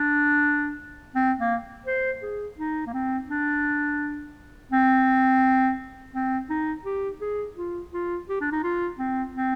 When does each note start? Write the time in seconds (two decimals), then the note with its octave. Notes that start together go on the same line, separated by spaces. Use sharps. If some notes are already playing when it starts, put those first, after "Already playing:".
Already playing: D4
1.15 C4
1.39 A#3
1.86 C5
2.22 G#4
2.58 D#4
2.86 A#3
2.93 C4
3.29 D4
4.71 C4
6.14 C4
6.50 D#4
6.85 G4
7.21 G#4
7.56 F4
7.93 F4
8.28 G4
8.41 D4
8.52 D#4
8.63 F4
8.98 C4
9.34 C4